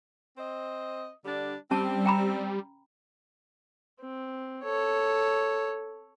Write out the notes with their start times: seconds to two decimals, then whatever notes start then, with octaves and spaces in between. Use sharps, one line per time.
0.37 C4 C5 D#5
1.25 D3 G3 D4
1.71 G3 C4 C#4 A5
2.05 G5 A#5 B5
4.00 C4
4.64 A4 C#5